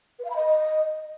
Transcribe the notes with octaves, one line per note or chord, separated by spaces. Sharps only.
B4
F5
B5
D#5